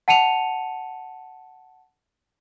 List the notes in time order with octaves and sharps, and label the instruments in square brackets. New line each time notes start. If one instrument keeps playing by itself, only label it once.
[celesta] F#5 A5 C#7 D#7 F7